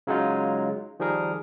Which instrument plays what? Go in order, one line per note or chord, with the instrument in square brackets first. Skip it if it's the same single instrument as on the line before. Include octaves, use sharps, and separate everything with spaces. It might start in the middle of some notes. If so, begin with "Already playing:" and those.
[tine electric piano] C#3 F#3 G#3 D#4 F4
D#3 F3 G3 G#4 A#4